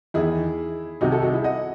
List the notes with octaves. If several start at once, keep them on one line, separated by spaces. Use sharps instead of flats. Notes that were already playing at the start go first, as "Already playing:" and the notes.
E2 D#3 E4 G#4
C2 C3 D#3 D#4 F#4
F#4 A4
D#4 F#4
E4 G#4
D#5 F#5